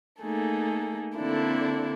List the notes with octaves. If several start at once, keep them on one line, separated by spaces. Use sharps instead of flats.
A3 A#3 D#4 G#4 A4
D3 A#3 C4 D4 E4 A4